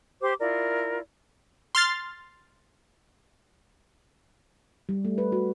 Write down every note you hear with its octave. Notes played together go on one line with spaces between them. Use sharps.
G4 C5 C6 D6
E4 F4 A#4 D5
C6 F6 A6 C7
G3
A3
B4
F#4